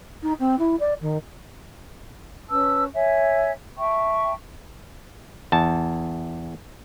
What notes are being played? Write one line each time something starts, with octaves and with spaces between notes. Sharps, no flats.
D#4
C4
E4
D5
D#3
C#4 B4 A5 E6
C#5 E5 G#5
E5 G5 A5 C#6
E2 A5